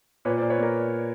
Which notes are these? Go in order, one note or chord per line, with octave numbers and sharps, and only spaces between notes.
A#2 B4 C#5
C5 D5
A#2
B4 C#5
A#3 A#4